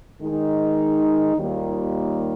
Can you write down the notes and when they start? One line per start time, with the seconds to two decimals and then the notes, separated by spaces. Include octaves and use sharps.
0.20 D#3 G#3 D#4
1.36 D#2 D#3 G3 A#3 F4